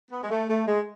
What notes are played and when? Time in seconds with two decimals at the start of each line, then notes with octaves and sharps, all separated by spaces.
0.11 B3
0.23 G#3
0.30 A3
0.49 A3
0.66 G#3